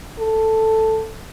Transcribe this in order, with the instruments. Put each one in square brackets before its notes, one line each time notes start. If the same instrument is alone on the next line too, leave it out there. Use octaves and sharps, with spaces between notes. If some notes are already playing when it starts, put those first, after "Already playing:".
[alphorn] A4